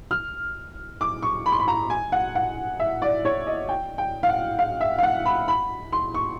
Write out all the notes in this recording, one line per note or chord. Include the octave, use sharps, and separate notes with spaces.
F6
D6
C#6
B5
C6
B5
A#5
G#5
F#5
F#5
E5
D5
C#5
D#5
G5
G5
F5
F#5
F5
E5
F5
F#5
B5
B5
C6
C#6